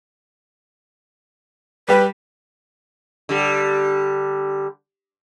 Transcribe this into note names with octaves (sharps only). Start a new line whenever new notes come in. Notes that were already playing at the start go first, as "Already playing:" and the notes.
G3 G4 B4
D3 G3